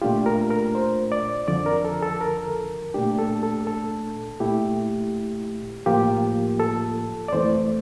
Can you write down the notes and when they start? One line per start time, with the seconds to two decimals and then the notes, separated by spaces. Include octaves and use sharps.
0.02 A#2 A3 D4 F4 G4
0.26 A#4
0.51 A#4
0.75 C5
1.12 D5
1.48 F2 D3 F3 D5
1.66 A#4
1.85 A4
2.03 A4
2.21 A#4
2.94 A#2 A3 D4 G4
3.19 A4
3.43 A4
3.67 A4
4.40 A#2 A3 E4 G4
5.86 A2 F3 A#3 F4 G4
6.60 A4
7.28 D5
7.32 F2 E3 A3 C5